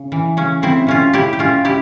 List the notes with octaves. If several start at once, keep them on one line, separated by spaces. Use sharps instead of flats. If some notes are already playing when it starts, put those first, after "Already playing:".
Already playing: C#3
E3
C#3 C#4
C#3 C4 E4
C#3 C#4 F4
C#3 E4 G4
G4
G#3 C#4 F4
C#3 E4 G4